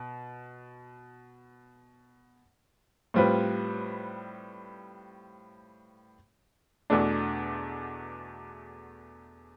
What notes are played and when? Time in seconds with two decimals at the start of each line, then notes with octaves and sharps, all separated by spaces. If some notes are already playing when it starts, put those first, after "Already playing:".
Already playing: B2
3.14 A2 G3 C4 F4 B4
6.90 E2 B2 A3 D4